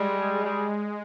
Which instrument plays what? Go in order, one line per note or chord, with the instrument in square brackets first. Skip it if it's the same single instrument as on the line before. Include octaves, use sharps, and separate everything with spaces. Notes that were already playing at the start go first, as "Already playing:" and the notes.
Already playing: [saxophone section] G3 [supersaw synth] G#3
[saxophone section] G#4
G3